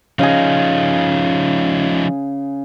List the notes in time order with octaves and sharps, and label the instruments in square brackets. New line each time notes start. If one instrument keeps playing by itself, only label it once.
[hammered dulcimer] C#3 G#4 [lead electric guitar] F3 D#4